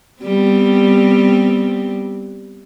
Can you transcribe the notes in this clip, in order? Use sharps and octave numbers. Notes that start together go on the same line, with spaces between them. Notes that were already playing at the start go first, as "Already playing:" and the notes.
G3 B3 C4